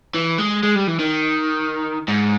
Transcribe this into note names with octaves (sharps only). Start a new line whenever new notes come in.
E3
G#3
G#3
G3
E3
D#3
G#2